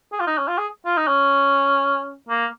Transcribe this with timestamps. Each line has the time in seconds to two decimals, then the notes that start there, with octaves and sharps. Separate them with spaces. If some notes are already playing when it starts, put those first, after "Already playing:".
0.12 G#4
0.20 F4
0.27 D#4
0.38 C#4
0.47 F4
0.58 G#4
0.85 F4
0.97 D#4
1.07 C#4
2.28 A#3